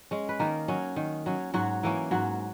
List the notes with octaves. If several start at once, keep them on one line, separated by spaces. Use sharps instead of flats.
G#3 C#4
B4
D#3 A#3 A#4
F#3 C#4
D#3
F#3 C#4
G#2 F#3 F#4
E3 A#3 C#4
G#2 F#3 F#4